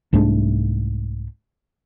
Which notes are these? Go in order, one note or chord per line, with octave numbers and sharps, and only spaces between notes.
C2 G#2 A3 D4